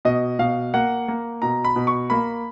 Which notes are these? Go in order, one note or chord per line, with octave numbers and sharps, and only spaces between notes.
B2 D#5
B2 F5
A#3 F#5
A#3
B2 A#5
B5
B2
C#6
A#3 B5